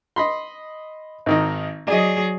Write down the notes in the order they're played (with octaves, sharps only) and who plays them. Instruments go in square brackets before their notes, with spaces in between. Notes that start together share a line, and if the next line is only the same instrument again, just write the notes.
[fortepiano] D#5 B5 C6
G#1 D#3 D#4
[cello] F#3 G#4 [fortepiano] D5 D#5